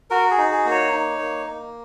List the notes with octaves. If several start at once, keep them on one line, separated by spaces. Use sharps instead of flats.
F#4 A#4
G#4
D#4
G#4
A#3
C#5
D#4
A#3
A#3